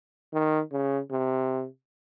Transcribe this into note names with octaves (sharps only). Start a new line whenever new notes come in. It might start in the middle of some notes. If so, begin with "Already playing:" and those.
D#3
C#3
C3